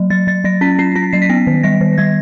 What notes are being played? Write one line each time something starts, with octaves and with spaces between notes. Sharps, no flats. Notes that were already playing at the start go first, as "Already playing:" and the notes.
Already playing: F#3
F#3 A6
F#3 A6
F#3 A#6
C#4 B6
C#4 C7
C#4 A#6
F#3 C7
B6
B3 A#6
D#3
G3 A#6
D#3
G3 G#6